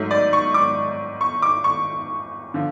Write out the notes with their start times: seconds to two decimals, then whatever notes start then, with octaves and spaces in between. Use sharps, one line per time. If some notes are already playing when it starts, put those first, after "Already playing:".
Already playing: G#2 F#3 A3
0.11 D5
0.33 C#6
0.54 D6
1.21 C#6
1.42 D6
1.64 C#6
2.54 D3 F3